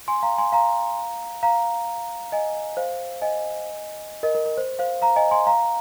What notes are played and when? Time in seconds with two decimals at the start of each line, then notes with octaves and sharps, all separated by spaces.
0.08 G#5 C6
0.23 F5 A#5
0.38 G#5 C6
0.52 F5 A#5
1.43 F5 A#5
2.32 D#5 G#5
2.77 C5 F5
3.22 D#5 G#5
4.23 A#4 D#5
4.35 A#4
4.46 A#4
4.58 C5
4.79 C5 F5
5.02 F5 A#5
5.16 D#5 G#5
5.31 G#5 C6
5.47 F5 A#5